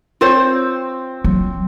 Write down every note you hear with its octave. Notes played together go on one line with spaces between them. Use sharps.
C4 F4 C5 C#5
F#3